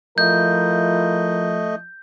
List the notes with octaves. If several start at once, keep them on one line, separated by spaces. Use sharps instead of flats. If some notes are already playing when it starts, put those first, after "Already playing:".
F3 A3 E4 F4 A#4 D#5 G6